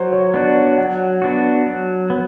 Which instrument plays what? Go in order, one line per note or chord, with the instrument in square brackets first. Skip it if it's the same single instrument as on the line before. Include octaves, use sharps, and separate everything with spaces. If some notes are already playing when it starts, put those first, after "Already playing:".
Already playing: [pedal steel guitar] F#3 [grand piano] C5
[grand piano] C#5
[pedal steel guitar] B3 D4 F#4 [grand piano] D5
[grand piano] C#5
[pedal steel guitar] F#3 [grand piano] F#5
[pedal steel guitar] B3 D4 F#4
F#3
B3